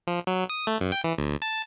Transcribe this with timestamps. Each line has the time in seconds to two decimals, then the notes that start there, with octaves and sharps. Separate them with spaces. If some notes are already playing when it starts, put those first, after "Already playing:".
0.07 F3
0.27 F#3
0.50 D#6
0.67 A3
0.81 F#2
0.92 G5
1.04 E3
1.18 D2
1.42 A5